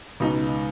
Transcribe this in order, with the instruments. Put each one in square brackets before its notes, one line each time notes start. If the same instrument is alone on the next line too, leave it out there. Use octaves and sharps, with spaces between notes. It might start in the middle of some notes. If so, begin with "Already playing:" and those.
[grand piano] C#2 B2 B3 D#4